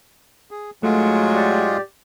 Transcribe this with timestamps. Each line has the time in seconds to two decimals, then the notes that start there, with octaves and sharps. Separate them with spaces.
0.51 G#4
0.83 G#2 F#3 G#3 A3 F4 G#4
1.34 G4 D5